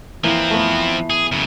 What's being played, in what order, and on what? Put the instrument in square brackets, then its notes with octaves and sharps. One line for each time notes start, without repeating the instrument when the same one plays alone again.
[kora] E3 A#3 [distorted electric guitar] F3 C4
[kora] A3 B3
[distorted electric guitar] G#4
F#2 C#3